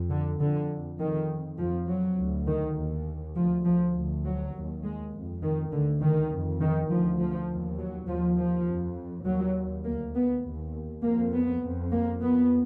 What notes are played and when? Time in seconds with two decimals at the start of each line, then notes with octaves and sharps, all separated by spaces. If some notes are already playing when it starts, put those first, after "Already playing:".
Already playing: F2
0.11 D3
0.41 F2 D3
1.00 F2 D#3
1.59 F2 F3
1.88 F#3
2.18 D2
2.47 D#3
2.77 D#2
3.36 D2 F3
3.65 F3
3.95 D2
4.25 F#3
4.54 D#2
4.84 G#3
5.14 F2
5.42 D#3
5.72 D2 D3
6.01 D#3
6.32 F2
6.61 D#3
6.90 D2 F3
7.20 F3
7.49 D#2
7.79 F#3
8.08 D#2 F3
8.37 F3
8.67 F2
9.26 D#2 F#3
9.85 D2 A#3
10.15 B3
10.44 D#2
11.03 F2 A#3
11.33 B3
11.62 F2
11.92 A#3
12.21 F2 B3